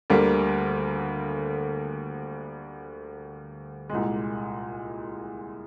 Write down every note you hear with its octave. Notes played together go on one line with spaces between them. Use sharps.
D2 D3 G3 A#3
C2 A#2 G#3